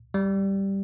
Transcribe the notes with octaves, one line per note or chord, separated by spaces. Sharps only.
G3